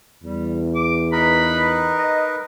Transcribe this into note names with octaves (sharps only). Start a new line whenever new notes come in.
E2 G3
D6
D#4 A#4 B4 B5
D#5